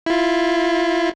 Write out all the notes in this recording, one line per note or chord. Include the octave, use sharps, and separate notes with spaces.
E4 F4